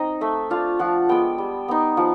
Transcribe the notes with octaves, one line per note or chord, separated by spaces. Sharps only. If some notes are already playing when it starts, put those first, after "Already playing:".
Already playing: C4 D#4 D#5
A3 E5
D4 F4 F5
F3 F#5
G#3 B3 G5
G3
B3 D#4
F3 F#5